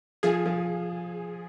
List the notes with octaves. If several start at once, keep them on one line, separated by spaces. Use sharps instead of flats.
F3 G#4
F3